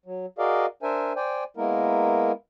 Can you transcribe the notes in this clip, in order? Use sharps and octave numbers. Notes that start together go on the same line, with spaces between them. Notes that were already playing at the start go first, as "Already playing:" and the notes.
F#3
F#4 G#4 A#4 D5 D#5 F5
D4 A#4 C5 E5 G#5
C5 D5 G5 G#5
G#3 A#3 B3 E4 A#4